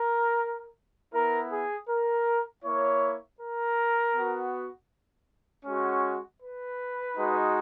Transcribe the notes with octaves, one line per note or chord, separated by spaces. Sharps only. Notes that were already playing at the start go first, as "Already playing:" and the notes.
Already playing: A#4
B3 E4 A#4
G#4
A#4
A#3 E4 C#5
A#4
B3 F#4
G#3 C#4 F#4
B4
G#3 D#4 F#4